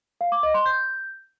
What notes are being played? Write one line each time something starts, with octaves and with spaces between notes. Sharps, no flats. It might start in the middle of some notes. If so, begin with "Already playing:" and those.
F5
D6
D#5
C6
G6